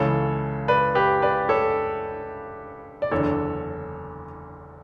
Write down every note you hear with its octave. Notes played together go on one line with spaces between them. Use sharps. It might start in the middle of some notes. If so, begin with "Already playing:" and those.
Already playing: C#2 C#3 E3 A4 C#5
B4 D5
G4 B4
B4 D5
A4 C#5
D5
F#1 E2 D3 A4 C#5